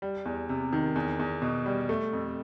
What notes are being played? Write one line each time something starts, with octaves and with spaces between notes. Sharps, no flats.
G3
E2
C3
D#3
E2
E2
B2
G3
A3
F2